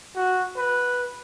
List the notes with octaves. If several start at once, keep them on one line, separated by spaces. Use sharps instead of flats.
F#4
B4